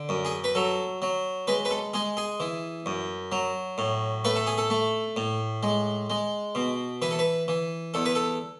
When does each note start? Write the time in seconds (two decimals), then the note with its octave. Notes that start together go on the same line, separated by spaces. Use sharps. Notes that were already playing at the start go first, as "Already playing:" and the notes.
Already playing: D3
0.09 F#2
0.25 G#4
0.44 B4
0.55 F#3 A4
1.02 F#3
1.47 G#3 B4
1.65 B4
1.71 A4
1.94 G#3 G#4
2.17 G#4
2.40 E3
2.86 F#2
3.32 F#3
3.78 A2
4.25 A3 B4
4.36 A4
4.47 G#4
4.58 A4
4.70 A3
5.17 A2
5.63 G#3
6.10 G#3
6.55 B2
7.02 E3 B4
7.11 A4
7.19 B4
7.48 E3
7.94 E2 A4
8.05 B4
8.15 A4